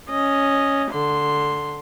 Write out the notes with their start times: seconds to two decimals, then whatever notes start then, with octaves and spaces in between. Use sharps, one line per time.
0.10 C#4 D#5
0.91 D3 C6